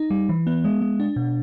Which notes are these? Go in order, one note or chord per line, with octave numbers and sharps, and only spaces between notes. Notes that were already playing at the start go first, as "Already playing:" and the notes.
Already playing: D#4
G3
E3
B3
G#3
G#3
D4
B2